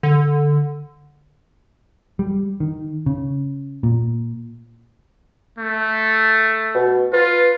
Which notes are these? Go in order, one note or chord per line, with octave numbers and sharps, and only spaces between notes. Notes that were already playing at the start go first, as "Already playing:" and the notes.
D3
G3
D#3
C#3
A#2
A3
B2
F4 B4